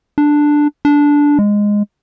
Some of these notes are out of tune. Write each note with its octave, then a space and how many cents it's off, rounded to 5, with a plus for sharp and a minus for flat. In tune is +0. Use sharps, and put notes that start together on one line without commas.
D4 +5
D4 -10
G#3 -10